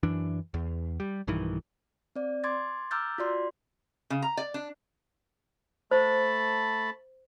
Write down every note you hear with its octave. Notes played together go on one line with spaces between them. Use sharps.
F#2 E3 D4
E2
G3
B1 G2 D#3 E3
C4 D5
C6 D6 G#6 A6
A#5 D6 E6 F6 G6 A6
F4 F#4 D5 C6
C#3
A#5
D5
D4
A3 C5 A5 B5